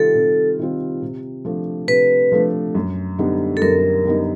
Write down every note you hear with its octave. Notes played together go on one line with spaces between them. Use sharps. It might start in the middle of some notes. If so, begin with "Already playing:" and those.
Already playing: C3 D#3 G3 C4 F4 A4
C3
D#3 G3 C4 F4
C3
F3 A3 D4
C3 B4
F3 A3 D4
F#2
D3 G3 B3 D#4
A4
F#2 A#4
D3 G3 B3 D#4